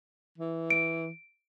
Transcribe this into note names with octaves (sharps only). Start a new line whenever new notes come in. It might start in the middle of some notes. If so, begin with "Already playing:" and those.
E3
D7